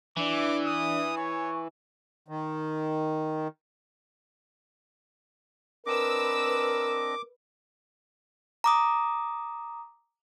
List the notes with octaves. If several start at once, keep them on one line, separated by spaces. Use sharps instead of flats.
E3 D4 E4 D5 D6
D#6
C#5 G#5 C#6
D#3
C4 D4 A#4 B4 D#5 D6 E6
A#5 D6 D#6